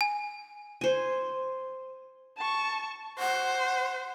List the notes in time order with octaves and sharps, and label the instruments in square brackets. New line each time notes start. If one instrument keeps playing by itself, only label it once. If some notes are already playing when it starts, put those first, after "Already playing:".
[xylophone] G#5
[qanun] C5 G#5
[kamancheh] A5 C#6
[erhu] C5 [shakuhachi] F#5